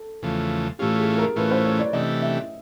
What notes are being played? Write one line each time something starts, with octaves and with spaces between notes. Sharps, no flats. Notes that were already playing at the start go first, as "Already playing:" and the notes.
Already playing: A4
E2 C#3 F3 A3
A2 E3 A3 C#4 F4 G4
G#4
A#4
A2 E3 A3 C#4 F4 B4
C5
C#5
D5
C3 E3 A3 D4 G4 D#5
E5